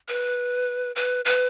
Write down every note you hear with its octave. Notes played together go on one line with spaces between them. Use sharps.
B4
B4
B4